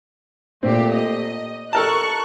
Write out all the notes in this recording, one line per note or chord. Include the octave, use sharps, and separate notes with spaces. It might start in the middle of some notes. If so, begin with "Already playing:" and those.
A#2 A3 C4 G4
D#5
A4 A#4 A5 C#6 F#6